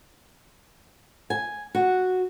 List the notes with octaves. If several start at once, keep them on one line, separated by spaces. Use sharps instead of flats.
G#5
F#4